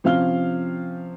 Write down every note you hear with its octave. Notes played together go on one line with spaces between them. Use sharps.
C3 F3 C#4 F5 F6 G7